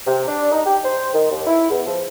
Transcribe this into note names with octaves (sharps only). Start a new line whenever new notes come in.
C3
D4
D#4
G4
C5
D#3
D#2
E4
E2
F3